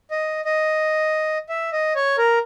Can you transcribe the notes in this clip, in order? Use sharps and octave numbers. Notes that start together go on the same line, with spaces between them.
D#5
D#5
E5
D#5
C#5
A#4